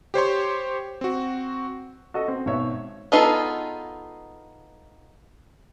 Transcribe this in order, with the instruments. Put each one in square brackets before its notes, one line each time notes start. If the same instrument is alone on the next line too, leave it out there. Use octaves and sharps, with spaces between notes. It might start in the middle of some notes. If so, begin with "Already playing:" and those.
[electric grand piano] G4 C5 C#5 C6
C4 F#4
[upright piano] F#4 A4 D#5
C4
G#1 B2 C#5 E5
[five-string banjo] B3 D#4 F4 G#4 A4